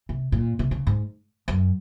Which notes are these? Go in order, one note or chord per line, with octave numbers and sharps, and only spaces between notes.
C3
A#2
C3
C#3
G#2
F#2